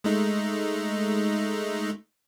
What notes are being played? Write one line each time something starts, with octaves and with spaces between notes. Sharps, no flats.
G#3 A3 D#4